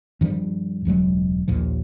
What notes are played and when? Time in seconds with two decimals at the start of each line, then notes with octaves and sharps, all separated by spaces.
0.21 G2 D#3 F3 G3
0.85 E1 C#2 F#3 G#3
1.48 A#1 D#2 A#2 F3